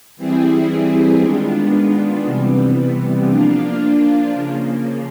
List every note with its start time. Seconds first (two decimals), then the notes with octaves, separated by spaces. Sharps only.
0.17 E3 G3 C4 E4 G#4
1.21 D#3 G#3 B3 D4 F4
2.24 C3 E3 G3 B3
3.29 F3 A#3 D4 F4
4.34 C#3 F3 A#3